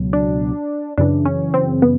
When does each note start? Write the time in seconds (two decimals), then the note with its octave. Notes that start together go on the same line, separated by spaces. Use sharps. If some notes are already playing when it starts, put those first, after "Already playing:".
Already playing: C#2 B2 F#3
0.13 D4
0.98 F#2 C#3 E3 D4
1.25 C#4
1.54 C4
1.82 B3